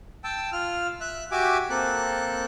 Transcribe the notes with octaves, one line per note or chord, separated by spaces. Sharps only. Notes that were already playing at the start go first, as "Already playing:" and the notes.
G5 A5 E6
F4 F6
E5 F#6
F#4 G4 E5 G#5 D6
A#3 C4 A4 F#6